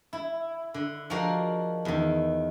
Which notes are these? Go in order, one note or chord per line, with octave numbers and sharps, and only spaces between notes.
E4
D3
F3 G#3 F4 F#4 A#4 D5
E2 D#3